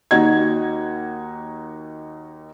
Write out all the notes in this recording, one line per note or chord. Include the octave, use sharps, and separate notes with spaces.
D#2 D#4 F#4 D#5 F#5 G#6